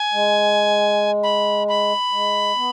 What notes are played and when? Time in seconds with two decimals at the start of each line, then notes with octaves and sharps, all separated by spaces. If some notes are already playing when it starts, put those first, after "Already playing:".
Already playing: G#5
0.13 G#3
1.23 B5
1.68 B5
2.12 G#3
2.56 B3